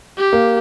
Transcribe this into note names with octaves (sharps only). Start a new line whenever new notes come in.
G4
A#3